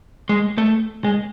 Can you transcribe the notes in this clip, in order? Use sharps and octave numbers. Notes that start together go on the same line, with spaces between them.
G#3
A3
G#3